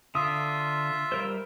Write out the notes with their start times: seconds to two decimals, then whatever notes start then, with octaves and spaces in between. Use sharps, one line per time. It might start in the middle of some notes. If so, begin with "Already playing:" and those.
0.15 D3 F4 E5 D#6
1.12 G3 A#4 C5